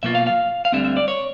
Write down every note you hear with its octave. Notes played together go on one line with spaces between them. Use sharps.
B2 F#3 A#3 D4 F4 E5
F5
F5
F5
D2 D3 G3 C4 E5
E5
D5
C#5